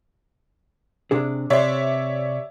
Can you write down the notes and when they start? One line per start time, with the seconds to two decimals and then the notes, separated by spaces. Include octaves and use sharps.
1.11 C3 D4 G#4
1.50 C3 C#5 D5 E5 C6